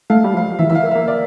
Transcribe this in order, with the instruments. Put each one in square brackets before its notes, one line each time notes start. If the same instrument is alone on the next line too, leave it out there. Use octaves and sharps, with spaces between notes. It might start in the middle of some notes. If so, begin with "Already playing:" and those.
[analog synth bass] A3 [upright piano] F5
[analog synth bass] G3
F3
[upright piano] F5
[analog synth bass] E3 [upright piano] E5
[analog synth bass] E3 [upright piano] E5
[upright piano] F5
[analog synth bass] A#3
[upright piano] E5
[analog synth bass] A#3
[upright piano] D5